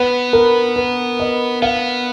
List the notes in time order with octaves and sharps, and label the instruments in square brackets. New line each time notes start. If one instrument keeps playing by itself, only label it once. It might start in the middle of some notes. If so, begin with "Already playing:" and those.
Already playing: [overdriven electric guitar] B3 [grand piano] B4
[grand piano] A#4
B4
D#5
[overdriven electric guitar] B3 [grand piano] F5